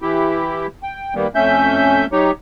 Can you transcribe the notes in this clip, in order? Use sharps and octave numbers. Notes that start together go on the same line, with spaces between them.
E3 E4 G4
G5
D#3 G3 A#3 B3
F2 A3 C#4 E5 G6
F#3 D#4 G4 C#5